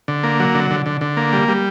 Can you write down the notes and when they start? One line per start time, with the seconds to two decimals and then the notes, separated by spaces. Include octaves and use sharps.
0.08 D3
0.23 A#3
0.40 F#3
0.54 D3
0.71 D3
0.86 D3
1.01 D3
1.17 A#3
1.33 G3
1.48 G3